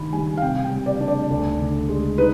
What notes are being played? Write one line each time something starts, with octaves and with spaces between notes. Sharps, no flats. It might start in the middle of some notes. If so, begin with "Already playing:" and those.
Already playing: D#3 D4 B5
G3 G#5
F5
C3 G5
G5
G3
D5
D4
D5
D2
D3
G#3
D#4 B4